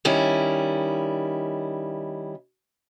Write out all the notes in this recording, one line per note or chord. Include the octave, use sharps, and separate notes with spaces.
D#3 G3 C#4 E4